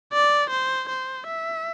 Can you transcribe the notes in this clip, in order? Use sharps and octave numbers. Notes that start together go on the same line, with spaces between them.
D5
C5
C5
E5